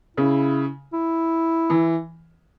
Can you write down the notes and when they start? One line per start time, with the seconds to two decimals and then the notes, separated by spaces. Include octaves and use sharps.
0.17 C#3 E4
0.93 E4
1.70 E3